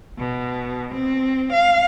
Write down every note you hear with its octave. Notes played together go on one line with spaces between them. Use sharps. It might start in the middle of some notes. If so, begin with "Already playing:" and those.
B2
C4
F5